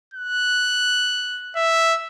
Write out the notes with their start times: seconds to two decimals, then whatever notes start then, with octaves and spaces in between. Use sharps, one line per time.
0.14 F#6
1.56 E5